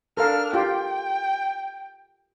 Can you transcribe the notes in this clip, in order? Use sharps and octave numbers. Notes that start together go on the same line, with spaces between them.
D4 A4 A#4 F5 F6
F4 G4 G5